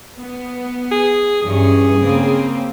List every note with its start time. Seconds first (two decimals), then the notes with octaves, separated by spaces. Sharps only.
0.18 B3
0.92 G#4
1.42 G2 E3 C#4 G#4
1.99 C#3 A#3 C4